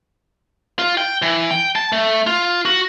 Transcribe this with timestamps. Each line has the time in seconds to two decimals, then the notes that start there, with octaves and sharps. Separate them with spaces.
0.79 F4
0.98 G5
1.22 E3
1.51 G5
1.76 A5
1.92 A3
2.27 F4
2.65 F#4